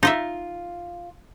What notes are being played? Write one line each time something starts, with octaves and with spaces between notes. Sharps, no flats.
D#4 F4 D#5 E5